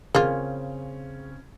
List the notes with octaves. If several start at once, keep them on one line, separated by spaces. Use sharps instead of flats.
C#3 A#3 C4 C#4 F4 G#4